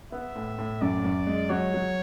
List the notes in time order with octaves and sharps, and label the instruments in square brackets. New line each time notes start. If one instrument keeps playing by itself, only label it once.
[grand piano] B3 [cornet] E5
[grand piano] A2
A2
[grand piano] F#2 [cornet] D5
[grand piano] F#2
G#3
[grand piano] F#3 [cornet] C#5
[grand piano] F#3